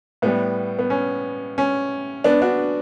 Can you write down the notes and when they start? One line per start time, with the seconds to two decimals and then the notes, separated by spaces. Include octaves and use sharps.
0.22 A2 G3 B3
0.79 B3
0.90 C#4
1.58 C#4
2.24 B3 D4
2.42 D4 F#4